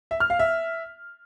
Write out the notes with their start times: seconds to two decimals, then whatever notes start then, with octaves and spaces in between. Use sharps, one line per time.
0.11 E5
0.20 F6
0.30 F5
0.39 E5